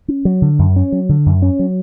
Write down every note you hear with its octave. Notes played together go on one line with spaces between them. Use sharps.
C#4
F#3
D3
F#2
C#4
F#3
D3
F#2
C#4
F#3